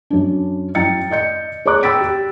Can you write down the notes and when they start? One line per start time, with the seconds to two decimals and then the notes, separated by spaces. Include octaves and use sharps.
0.10 F#2 D4
0.75 F#2 E4 G5 A#5 A6 C#7
1.10 D5 D#5 G6 C#7
1.65 G#4 C#5 D5 A#5 D6 F#6
1.83 G5 B5 E6 A6 B6 D7
2.01 G4